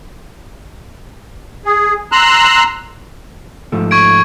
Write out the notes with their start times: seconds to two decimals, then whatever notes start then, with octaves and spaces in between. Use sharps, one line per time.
1.65 G#4
2.12 A#5 C6 E6 F#6
3.72 G#2 F3 A3
3.91 C#6 G#6 D7